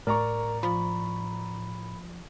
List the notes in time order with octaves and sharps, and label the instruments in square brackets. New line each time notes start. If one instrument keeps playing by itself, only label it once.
[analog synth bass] A2 [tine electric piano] A#4 [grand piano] D5 A#5 C#6
[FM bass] F3 [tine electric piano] B5